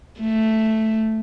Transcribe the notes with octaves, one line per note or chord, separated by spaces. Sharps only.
A3